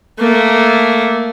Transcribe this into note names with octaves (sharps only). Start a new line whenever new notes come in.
A3 A#3